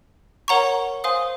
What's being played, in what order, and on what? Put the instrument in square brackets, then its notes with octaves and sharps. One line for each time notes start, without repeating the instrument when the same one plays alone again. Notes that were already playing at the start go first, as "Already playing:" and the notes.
[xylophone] A#4 C#5 F#5 A#5 C#6
C5 F5 G#5 C6 D#6